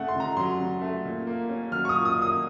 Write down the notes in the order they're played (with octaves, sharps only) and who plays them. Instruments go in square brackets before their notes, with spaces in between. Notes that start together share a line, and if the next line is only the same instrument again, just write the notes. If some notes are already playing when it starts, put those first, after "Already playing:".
Already playing: [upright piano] C#3 A3 F#5
C6
C#3
A#5
F#3 C6
C#3
A3
A#2
A#3
C#4
F#3 F6
C#6
D#6
A#2
D#6
A#3 D#6